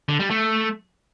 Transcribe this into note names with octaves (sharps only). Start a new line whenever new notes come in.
D3
G3
A3